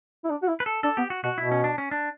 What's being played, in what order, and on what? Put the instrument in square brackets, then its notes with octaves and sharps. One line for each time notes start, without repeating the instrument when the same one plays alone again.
[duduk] E4
D4
F#4
E4
[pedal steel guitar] B4
A4
[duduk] D4 [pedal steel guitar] A4
[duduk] B3 [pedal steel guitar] G4
[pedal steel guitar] F#4
[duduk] B2 [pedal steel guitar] F#4
[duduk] B2 [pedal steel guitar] E4
[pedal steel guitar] C#4
D4
C#4
D4